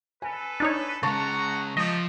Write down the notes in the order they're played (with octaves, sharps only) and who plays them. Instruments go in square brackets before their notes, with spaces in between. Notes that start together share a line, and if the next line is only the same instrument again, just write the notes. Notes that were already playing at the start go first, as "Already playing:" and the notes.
[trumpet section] A4 B4 [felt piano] G#5
[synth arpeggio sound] D4 D#4 C#5
[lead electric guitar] C#3 G#3 [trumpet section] F#5 A#5 [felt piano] A5 C#6 A6
[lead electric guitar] F3 [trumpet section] A3 G4 [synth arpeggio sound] D#5